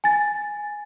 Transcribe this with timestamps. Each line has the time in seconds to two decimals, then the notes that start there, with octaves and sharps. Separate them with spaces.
0.04 G#5 A6